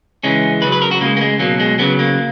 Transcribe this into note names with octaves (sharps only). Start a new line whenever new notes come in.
C#3 E3 G#3 C#4
C#3 F#3 B4
B4
A#4
F#4
C#3 G#3 A#3
A#3
G#3
B2 F#3 A#3
G#3
C#3 F#3 B3
A#3